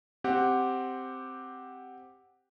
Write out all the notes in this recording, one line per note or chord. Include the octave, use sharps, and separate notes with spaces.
C4 G4 F#5